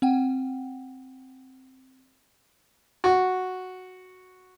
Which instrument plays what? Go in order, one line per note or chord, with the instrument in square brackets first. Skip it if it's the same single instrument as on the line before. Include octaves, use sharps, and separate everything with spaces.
[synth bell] C4 F#5 G5
[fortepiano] F#4